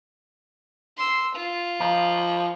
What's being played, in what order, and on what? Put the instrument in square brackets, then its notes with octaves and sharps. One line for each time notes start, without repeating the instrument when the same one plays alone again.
[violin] C6 E6
F4
[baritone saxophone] F3 [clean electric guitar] D#5 F5 A#5